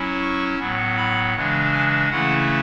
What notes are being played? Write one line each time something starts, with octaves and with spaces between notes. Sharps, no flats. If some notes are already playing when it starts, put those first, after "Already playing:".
Already playing: F#3 C#4 E4
C#6
A2 F#3 B3
B5
C#3 E3 G#3 D4
G#5
C#3 E3 A3 C#4 E4 F#5